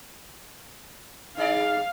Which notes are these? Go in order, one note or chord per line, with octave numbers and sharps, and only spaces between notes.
D#4 G#4 D5 F5